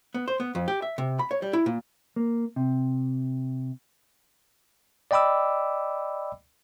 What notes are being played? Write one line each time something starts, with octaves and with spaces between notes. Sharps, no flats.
B3
C5
B3
F2
G4
E5
C3
B5
C#5
G3
E4
A#2
A#3
C3
D5 D#5 G5 B5 D6 E6